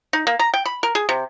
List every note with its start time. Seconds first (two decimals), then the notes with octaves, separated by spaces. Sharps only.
0.13 D#4
0.27 A#3
0.39 A#5
0.54 G5
0.65 B5
0.83 A#4
0.95 G#4
1.09 C3